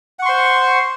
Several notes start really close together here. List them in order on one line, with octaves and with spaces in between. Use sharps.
F#5 C#6 C6 C5